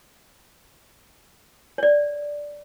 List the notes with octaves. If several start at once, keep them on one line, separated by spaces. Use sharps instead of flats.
C#5 D5